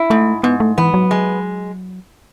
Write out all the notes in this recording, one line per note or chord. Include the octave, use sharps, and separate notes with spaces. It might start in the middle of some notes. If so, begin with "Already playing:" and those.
Already playing: E4
G#2 A3
G#2 B3
A3
E3 B3
F#3
G#3